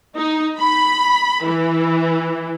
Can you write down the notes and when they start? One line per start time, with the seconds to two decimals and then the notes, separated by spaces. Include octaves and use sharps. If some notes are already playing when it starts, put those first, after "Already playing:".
0.16 D#4
0.59 B5
1.46 E3